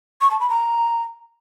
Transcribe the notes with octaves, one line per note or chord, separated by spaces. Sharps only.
C#6
A5
B5
A#5